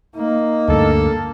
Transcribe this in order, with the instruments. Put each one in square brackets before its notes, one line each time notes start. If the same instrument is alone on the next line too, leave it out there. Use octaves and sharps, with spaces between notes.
[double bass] A#3 [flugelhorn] D#4
[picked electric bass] D2 G2 [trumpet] A4